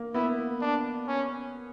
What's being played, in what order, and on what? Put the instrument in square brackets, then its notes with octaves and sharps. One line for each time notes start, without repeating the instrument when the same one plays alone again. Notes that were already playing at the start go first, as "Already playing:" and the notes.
Already playing: [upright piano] A#3
[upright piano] B3 [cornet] E4
[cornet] D4
C#4